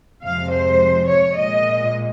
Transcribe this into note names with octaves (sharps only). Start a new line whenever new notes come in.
F2 C3 F3 G#3 F5
C5
C#5
A#2 G#3 D#5